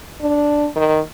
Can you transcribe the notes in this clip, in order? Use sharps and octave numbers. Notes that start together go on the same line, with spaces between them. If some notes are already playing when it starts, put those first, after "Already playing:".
D4
D#3